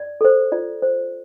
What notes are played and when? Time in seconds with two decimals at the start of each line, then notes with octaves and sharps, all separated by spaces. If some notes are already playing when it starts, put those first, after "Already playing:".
Already playing: D5
0.21 A4 C5
0.52 F4 D5
0.82 C5